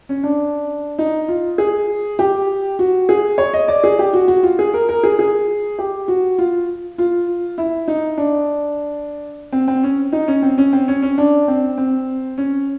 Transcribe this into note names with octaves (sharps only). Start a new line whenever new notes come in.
C#4
D4
D#4
F4
G#4
G4
F#4
G#4
C#5
D#5
D5
G#4
G4
F#4
F#4
F4
G#4
A#4
A#4
G#4
G#4
G4
F#4
F4
F4
E4
D#4
D4
C4
C4
C#4
D#4
C#4
C4
C#4
C4
C#4
C#4
D4
C4
C4
C#4